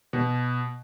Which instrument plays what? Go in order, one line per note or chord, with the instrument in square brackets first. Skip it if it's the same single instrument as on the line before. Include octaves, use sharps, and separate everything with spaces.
[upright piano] B2